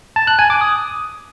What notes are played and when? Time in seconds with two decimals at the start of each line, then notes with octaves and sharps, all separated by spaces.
0.16 A5
0.27 F#6
0.39 G#5
0.50 D6
0.61 D#6